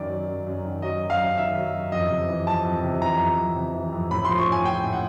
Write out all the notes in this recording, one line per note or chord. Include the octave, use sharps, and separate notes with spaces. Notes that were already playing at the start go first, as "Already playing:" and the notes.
Already playing: F#2 D#3 D5
F#3
F#2
F#2
D#3
F#3 D#5
F#2
F5
F#2
D#3 E5
F#3
F#2
F2 D#5
C3
E3
F2 A5
F2
C3
E3 A#5
F2
F2
C3
E3
F2
A2 B5
C6
F3
C#6
A2 G#5
F3 G5
A2
F#5